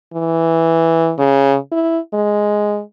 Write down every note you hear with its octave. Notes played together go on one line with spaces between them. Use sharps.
E3
C#3
E4
G#3